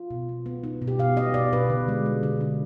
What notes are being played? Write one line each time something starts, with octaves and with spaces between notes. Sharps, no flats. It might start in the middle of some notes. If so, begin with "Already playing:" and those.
Already playing: F4
B2
B3
B3
B3 D#4
B2
G4
B2 F5
B3 D#5
B2 D5
B2 B4
D3
G#3
G#3
D3
D3